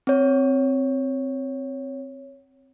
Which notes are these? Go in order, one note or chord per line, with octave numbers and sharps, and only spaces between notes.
C4 C#5